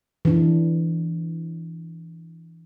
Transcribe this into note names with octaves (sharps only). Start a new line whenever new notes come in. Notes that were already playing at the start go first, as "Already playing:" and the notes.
E3 D4